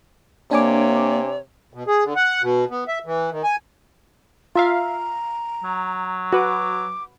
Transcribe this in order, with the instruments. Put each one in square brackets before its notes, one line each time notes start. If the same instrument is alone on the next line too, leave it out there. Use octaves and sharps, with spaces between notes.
[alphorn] C3 [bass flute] A#3 [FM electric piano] D4 G#5 D6 [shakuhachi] C#5
[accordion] B2
G#4
D3
F#5
B2
B3
E5
E3
D#3
G#5
[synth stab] F4 E5 F5 [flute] A#5
[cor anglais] F#3
[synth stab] F#4 B4 [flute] D6